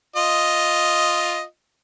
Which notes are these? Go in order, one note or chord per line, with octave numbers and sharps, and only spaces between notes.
F4 D#5